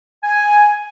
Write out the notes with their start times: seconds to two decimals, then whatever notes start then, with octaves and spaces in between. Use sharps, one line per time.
0.24 G#5